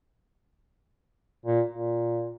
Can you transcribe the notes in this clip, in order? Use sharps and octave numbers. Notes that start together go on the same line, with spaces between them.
A#2
A#2